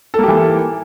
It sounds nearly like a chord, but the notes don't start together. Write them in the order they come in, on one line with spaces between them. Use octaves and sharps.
A4 A#3 G4 E3